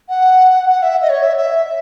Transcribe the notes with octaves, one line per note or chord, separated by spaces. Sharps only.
F#5
F#5
E5
D#5
C#5
E5
E5